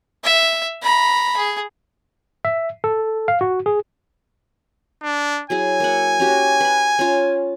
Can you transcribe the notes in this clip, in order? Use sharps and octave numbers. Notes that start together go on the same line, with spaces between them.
E5
A#5 B5
G#4
E5
A4
F5
F#4
G#4
D4
F#3 E4 G#4 G#5
A#3 E5 F#5
C#4 F#4 G4
B4 B5
C#4 F4